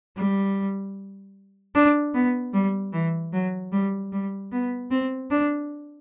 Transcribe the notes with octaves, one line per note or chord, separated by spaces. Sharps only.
G3
D4
B3
G3
E3
F#3
G3
G3
B3
C4
D4